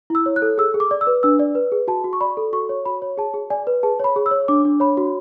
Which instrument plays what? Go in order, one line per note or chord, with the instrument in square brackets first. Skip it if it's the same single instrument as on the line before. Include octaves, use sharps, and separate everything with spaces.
[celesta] E4 E6
C#5
F#6
A4
G#4 E6
G#4
D6
D5
E6
B4
D4 E6
D5
B4
G#4
F#4 A5
F#4
C#6
D5 B5
A4
F#4 C#6
C#5
F#4 B5
C#5
G#4 A5
G#4
D5 G#5
B4
G#4 A5
C#5 B5
G#4
E6
C#5
D4 D6
D4
C#5 B5
F#4